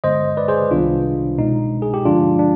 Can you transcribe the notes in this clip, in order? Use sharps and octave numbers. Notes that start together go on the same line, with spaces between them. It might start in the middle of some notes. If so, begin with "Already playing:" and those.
G2 D3 G#3 B3 C5 D#5
B4 D5
G#4 C5
C2 C3 D#3 G3 B3 D4 F4
B2 G#3 B3 D#4
G#4
G4
G2 D3 F3 G#3 B3 D4 F4
D4